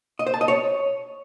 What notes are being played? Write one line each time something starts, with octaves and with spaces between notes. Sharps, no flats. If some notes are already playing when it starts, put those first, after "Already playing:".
D#5
C5
A5
D#5
C#5